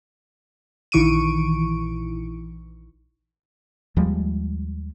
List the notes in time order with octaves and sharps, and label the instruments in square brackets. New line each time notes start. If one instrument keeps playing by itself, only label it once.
[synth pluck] A#1 D#3 E3 C#6 D7 D#7
[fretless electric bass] D#2 F3 G3 G#3